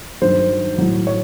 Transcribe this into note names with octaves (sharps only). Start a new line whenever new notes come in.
G2 D#3 F#3 C5
A2 F#3
C#5